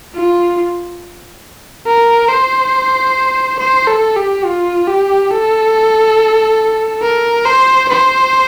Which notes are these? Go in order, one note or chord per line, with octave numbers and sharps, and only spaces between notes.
F4
A#4
C5
C5
A4
G4
F4
G4
A4
A#4
C5
C5